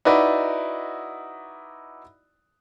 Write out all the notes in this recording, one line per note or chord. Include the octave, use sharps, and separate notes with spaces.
D#4 E4 F#4 B4 D5